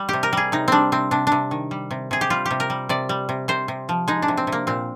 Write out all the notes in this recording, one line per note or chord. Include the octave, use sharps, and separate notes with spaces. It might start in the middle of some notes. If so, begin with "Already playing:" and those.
Already playing: G3
C3 G4
A#4
G3 G#4
C3 D#4
G3 C4 D4
C3 C4
C3 D4
C3 D4
D#3
G3
C3
C3 G#4
G4
G3 F4
G4
C3
A#4
G3
C3 D5
G3
C3
C3 C5
C3
F3
G#3 D#4
D4
C3
C4
C3
A#3
A#2 C4